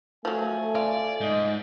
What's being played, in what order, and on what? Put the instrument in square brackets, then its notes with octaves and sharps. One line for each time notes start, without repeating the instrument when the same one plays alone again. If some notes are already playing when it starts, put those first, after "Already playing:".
[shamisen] F3 F#3 [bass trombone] A3 [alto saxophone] G#5
[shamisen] F4 [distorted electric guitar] D5
[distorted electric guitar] G#2 [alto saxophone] D#5